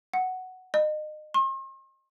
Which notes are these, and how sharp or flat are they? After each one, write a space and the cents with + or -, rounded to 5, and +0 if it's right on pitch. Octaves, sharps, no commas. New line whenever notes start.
F#5 +5
D#5 -30
C6 +45